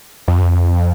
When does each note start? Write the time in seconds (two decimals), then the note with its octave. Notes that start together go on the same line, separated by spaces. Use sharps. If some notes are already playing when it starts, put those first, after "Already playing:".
0.28 F2
0.38 F#2
0.42 F2